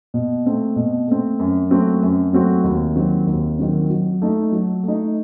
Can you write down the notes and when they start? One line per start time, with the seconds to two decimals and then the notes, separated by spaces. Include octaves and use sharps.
0.14 B2
0.46 A3 C4
0.76 B2
1.08 A3 C4
1.39 F#2
1.71 F#3 A3 C4 F#4
2.02 F#2
2.33 F#3 A3 C4 F#4
2.64 D#2
2.96 D#3 F#3 C4
3.27 D#2
3.59 D#3 F#3 C4
3.89 F#3
4.22 A3 D#4
4.52 F#3
4.83 A3 D#4